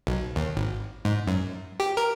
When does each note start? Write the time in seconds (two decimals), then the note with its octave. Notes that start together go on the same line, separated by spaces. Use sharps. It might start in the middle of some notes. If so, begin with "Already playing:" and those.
0.07 B1
0.36 D#2
0.57 G#1
1.05 G#2
1.28 F#2
1.80 G4
1.97 A#4